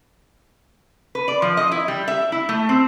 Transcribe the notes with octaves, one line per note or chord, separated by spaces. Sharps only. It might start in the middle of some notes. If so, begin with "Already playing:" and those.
B4
D5
F3
D#5
E4
G3
E5
E4
A3
C4